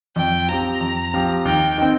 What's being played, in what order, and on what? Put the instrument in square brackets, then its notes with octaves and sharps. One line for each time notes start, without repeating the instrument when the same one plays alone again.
[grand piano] F2 [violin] G5
[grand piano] F3 C4 G4 [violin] A#5
[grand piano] F2
F3 C4 G4
[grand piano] D#2 [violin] G5
[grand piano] D#3 C4